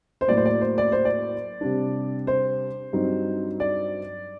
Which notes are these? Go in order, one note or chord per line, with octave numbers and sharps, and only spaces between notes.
C5
A2 F#3 A#3 D5
C5
D5
C5
D5
C5
D5
C3 G3 D4
C5
G2 F#3 C4 D#4
D5